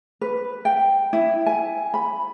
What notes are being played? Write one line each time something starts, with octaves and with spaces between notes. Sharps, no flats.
B4
G5
E4
G#5
B5